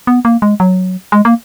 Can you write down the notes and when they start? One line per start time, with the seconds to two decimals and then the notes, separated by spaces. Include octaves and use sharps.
0.07 B3
0.25 A#3
0.42 G#3
0.60 F#3
1.12 G#3
1.25 A#3